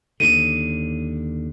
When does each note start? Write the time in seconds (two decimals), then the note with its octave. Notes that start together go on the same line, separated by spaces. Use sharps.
0.20 D#2 D3 D#7